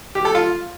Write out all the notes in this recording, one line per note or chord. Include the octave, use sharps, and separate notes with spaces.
G4
A4
F4